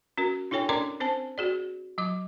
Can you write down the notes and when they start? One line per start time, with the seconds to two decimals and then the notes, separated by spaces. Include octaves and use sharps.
0.18 C#4 F#4 A#4
0.51 D4 E4 A4 C#5 G5 G#5
0.69 C#4 D4 A#4 D5 A#5 D6
1.00 C4 C5 G#5 A5
1.38 F#4 G#4 D5
1.98 F#3 D6